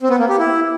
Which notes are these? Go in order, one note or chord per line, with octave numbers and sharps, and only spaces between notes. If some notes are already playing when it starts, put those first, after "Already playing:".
C4
B3
A#3
G4
E4